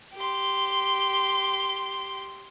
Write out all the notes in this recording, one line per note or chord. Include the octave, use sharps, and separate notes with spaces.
G4 C6